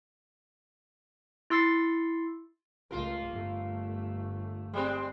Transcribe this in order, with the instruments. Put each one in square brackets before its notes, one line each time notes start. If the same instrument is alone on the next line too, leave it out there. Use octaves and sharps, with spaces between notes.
[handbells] E4 C6 E6 A6 C7 C#7
[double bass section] C#2 A3 [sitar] A#3 F4 A#4
[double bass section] G1 A3
[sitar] G3 G#3 C4